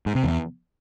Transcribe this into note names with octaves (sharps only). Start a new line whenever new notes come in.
G#2
C3
E2